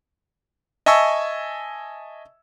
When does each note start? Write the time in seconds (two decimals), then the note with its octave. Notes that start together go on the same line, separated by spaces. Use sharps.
0.86 D#5 E5 G#5 A5 C#6 E6